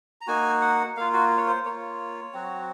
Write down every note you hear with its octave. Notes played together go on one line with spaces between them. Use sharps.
A#5
A#3 D#4 F#4 G#5
F#5
A#3 F4 F5
F#4
C#5
C5
A#3 F4 C#5
F#3 C4 F#4